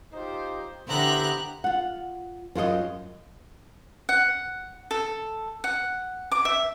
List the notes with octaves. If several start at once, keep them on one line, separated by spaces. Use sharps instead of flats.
D#4 F4 G4 C5
D3 B3 E4 G4 C5 E5 A#5 F#6
F4 F#5
F#2 F4 A#4 D#5
F#5
A4
F#5
D6
E5